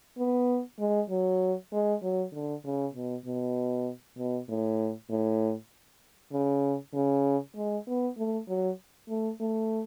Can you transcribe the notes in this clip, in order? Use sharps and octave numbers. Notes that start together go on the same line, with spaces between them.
B3
G#3
F#3
G#3
F#3
D3
C#3
B2
B2
B2
A2
A2
C#3
C#3
G#3
B3
A3
F#3
A3
A3